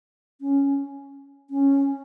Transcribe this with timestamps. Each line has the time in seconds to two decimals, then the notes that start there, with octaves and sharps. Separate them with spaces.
0.41 C#4
1.50 C#4